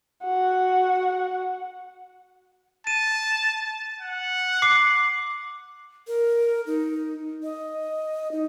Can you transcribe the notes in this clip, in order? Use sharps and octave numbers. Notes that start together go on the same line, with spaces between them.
F#4 F#5
A5 D#7
F#5
D6 C7
A#4
D#4
D#5
D#4